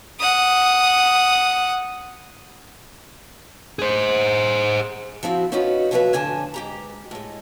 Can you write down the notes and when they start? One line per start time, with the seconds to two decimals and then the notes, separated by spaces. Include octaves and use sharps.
0.20 F#5 D#6
3.79 G#4 C5
5.23 F3 C4 E4 F#4
5.52 C#4 D#4 F4 F#4 B4 C#5
5.91 D#2 F3 F#3 F4 B4 E5
6.13 F2 A2 D3 G#5 A5
6.54 G#2 G4 A#5
7.11 A2 G#3